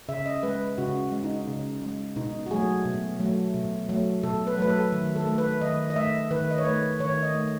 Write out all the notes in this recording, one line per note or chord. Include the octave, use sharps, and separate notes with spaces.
C#3 E5
D#5
G#3 B4
C#3 F#4
G#3
D#4
C#3
G#3
B2 D#4
F#4
F#3 A3 G#4
B2
F#3 A3
B2
F#3 A3
B2 A4
B4
F#3 A3 B4
A4
D#3
A4
A3
B4
D#3 D#5
D#5
A3 E5
D#3 B4
D#5
C#5
A3 B4
D#3 C#5
D#5
A3